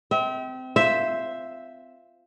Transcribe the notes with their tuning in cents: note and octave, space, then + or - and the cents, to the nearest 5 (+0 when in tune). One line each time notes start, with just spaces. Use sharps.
C4 -25 E5 -40
F4 -10 C5 +0 E5 +0